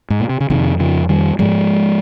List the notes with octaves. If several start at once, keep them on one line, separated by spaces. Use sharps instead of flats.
G#2
A#2
C3
C#3
F2 C3 D#3
C#3 F3
D#3 G3
G#2 F3 G#3